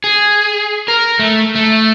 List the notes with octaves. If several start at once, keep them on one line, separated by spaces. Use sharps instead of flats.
G#4
A#4
A3
A3